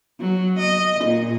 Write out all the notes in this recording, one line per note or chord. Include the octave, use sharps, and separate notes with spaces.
F#3
D#5
A#2